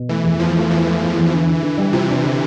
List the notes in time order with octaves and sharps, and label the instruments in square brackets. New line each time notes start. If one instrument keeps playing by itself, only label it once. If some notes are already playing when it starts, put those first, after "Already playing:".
Already playing: [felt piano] B2
[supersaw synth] E3 [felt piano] A3
[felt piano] E2
[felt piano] E2 [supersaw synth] F3
[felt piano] A3
[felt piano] E2 [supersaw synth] E3
[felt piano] A3
E2
E2
D3
D3
D3
G3
[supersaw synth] C3 [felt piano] F4
[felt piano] D4
D3